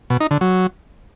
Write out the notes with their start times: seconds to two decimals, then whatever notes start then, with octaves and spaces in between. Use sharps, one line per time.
0.10 B2
0.20 D#4
0.31 D3
0.41 F#3